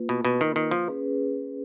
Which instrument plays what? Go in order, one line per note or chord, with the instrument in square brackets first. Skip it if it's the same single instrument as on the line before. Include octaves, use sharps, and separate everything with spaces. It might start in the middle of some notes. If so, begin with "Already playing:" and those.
Already playing: [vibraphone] A#3 F4 B4
[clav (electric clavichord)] B2
B2
D#3
D#3
F3
[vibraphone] C#4 G#4 B4